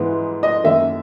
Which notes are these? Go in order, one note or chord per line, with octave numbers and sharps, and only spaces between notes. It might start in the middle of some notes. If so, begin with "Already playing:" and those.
Already playing: G#2 E3 G#3 B3
D#5
F#2 D#3 A#3 E5